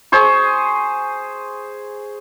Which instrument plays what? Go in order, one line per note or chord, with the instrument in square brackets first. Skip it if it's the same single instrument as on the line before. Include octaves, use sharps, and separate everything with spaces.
[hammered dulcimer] G#4 C5 C#6